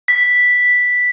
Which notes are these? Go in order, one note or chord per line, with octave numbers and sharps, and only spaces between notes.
B6